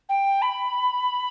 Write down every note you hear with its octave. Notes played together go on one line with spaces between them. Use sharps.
G5
B5